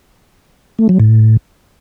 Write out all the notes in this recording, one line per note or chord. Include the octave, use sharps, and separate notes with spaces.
A3
F#3
A2